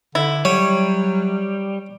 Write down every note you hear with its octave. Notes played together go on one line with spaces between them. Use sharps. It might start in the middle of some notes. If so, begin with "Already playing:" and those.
D3 E4
F#3 G3 C#5